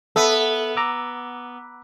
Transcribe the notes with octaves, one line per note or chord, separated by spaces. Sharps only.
B3 A4 E5
A#5 D6 E6